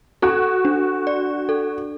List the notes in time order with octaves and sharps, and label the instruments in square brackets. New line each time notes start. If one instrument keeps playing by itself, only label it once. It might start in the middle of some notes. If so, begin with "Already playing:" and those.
[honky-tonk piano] F#4 [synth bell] A4
[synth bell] D4
D5
A4